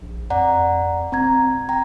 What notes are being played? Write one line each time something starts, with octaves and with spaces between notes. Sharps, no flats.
A#1
F2 D5 F#5 A#5
E1 C4 A#5 G#6
G5 A#5